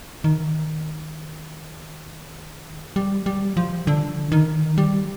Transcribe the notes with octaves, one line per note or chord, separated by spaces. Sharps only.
D#3
G3
G3
F3
D3
D#3
G3